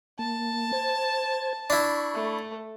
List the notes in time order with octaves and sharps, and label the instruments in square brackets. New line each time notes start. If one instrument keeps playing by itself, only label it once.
[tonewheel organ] A#3 [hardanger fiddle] A5
[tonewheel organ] C5 G#6
[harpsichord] D4 E4 [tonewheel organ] B5 C#6
[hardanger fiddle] A3